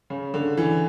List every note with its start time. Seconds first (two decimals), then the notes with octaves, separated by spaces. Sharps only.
0.10 C#3
0.34 D3
0.57 E3